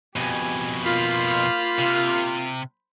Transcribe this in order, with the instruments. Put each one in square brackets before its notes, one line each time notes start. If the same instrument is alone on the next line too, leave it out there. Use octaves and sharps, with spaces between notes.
[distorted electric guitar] F2 B2 [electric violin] G4 G#5
[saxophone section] A#3 F4 [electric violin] C5 B5
[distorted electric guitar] C3